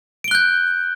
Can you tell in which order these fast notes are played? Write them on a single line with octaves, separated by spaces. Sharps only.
D7 G7 F#6 G6